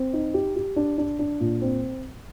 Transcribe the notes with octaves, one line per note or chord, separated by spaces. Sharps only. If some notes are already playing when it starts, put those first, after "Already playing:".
Already playing: C4
D#4
G4
G4
D4
D4
D4
A#2
C4